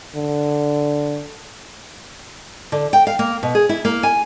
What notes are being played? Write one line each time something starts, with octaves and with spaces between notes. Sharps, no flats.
D3
D3
G5
F5
A#3
B2
G#4
E4
A#3
G#5